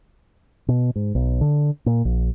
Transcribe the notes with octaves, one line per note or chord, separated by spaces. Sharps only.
B2
G#2
B1
D3
A#2
A#1